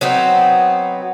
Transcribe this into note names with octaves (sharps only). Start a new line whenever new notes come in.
F#3 B3 C4 D#4